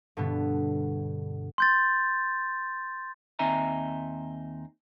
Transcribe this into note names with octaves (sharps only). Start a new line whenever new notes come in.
G2 B2 D3 B3
C6 G6 A6
D#2 C4 D#4 E5 G#5 A#5